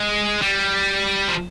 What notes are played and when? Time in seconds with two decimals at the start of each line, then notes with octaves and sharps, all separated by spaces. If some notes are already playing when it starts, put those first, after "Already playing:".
Already playing: G#3
0.42 G3
1.29 F3